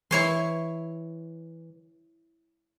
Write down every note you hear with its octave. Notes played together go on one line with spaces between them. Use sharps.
E3 E4 C#5 C6